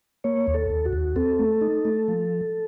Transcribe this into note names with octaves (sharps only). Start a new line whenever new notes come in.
A#3 C#5
D#2
A4
D#2
F#4
D#2
C4 A4
A3
D#4
A3
F3